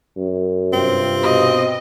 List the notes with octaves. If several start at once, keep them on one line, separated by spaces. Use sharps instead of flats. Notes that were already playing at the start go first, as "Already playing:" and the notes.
F#2
G2 C3 C4 F4
B2 D#5